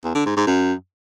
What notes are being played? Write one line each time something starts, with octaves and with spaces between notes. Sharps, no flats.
E2
D3
G#2
G#2
F#2